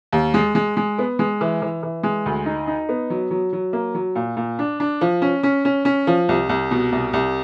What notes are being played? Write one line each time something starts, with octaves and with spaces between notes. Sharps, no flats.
D#2
G#3
G#3
G#3
B3
G#3
E3
E3
E3
G#3
D2
D#4
D#4
B3
F#3
F#3
F#3
A#3
F#3
A#2
A#2
D4
D4
F3
C#4
C#4
C#4
C#4
F3
C2
C2
B2
C2
C2